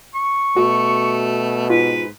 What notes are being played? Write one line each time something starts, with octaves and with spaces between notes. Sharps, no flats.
C#6
B2 A3 F#4
G#2 F4 B4